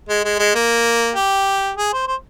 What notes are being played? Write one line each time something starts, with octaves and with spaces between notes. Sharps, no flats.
G#3
G#3
G#3
A#3
G4
G#4
C5
C5